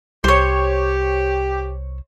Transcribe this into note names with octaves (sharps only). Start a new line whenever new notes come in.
C2 G4 C5 C#5